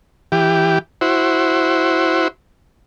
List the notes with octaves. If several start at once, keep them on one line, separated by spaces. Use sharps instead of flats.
E3 G4
E4 F#4 C5